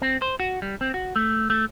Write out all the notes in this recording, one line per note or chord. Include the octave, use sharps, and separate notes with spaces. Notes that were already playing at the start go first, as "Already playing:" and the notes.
C4
C5
F#4
G3
C4
F#4
A3
A3